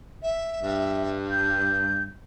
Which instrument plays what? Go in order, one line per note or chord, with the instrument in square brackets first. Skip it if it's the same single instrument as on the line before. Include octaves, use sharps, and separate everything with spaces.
[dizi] E5
[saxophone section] G2
[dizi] G6